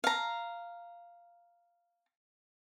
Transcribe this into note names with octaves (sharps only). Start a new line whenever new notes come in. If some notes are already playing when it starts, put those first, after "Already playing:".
F5 A#5